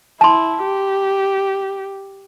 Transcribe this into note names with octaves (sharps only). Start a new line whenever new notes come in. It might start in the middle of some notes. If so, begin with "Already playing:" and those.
E4 A5 C6
G4